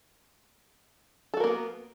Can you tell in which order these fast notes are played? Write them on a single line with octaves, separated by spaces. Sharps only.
A4 F#4 A#4 A#3 B3